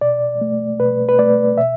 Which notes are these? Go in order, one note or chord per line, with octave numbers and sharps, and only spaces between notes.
B2 D5
A3
B2 B4
B4
A3 D5
B2 E5